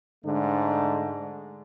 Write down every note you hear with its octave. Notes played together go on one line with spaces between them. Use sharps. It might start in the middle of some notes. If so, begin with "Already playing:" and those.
G#2 D3 A3 D4